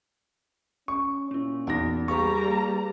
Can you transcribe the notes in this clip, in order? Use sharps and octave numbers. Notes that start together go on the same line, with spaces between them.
C#4 C#6
A#2 C#4 E4
E2 D#4 F#4 D5 A#6
G3 A#3 G#4 B4 F5 A#5 C#6 A6